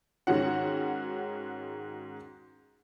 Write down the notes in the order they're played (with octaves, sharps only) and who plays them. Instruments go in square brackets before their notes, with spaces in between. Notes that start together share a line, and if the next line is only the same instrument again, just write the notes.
[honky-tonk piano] G#2 D#3 C#4 F#4 F#5